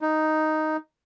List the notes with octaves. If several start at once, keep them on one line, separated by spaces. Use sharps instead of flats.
D#4